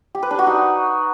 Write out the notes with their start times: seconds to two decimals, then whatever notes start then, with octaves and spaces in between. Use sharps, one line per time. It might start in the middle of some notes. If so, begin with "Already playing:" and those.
0.15 G4
0.23 B4
0.31 D4
0.39 F#4
0.47 D#4